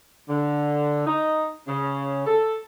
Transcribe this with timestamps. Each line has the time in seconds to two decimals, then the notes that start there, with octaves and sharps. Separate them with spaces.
0.29 D3
1.06 D#4
1.68 C#3
2.26 A4